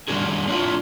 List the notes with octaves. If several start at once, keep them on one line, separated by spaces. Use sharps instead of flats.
D#3 G3 C4 D4 F#4 G#4
C4 D4 E4 F4